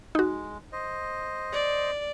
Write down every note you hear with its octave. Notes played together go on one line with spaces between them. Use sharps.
G#3 D#4 F#4
C5 D#5
D5